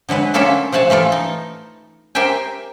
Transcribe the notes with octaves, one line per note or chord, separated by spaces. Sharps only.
D3 F#3 G#3 B4
F#3 A#3 C#4 F4 A4 E5
F3 A3 F#5 G#5 A5
E3 A3 F4 A4
D#4
G4 A#4 C5 E5 G5 G#5